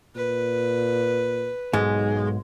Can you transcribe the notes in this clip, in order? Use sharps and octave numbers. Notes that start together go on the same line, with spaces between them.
A#2 B4
B1 G#2 G#3